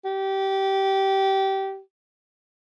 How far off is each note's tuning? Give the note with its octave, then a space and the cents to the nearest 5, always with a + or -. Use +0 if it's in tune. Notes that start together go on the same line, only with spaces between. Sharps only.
G4 -20